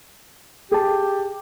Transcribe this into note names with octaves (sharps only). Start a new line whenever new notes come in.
G4 G#4 A5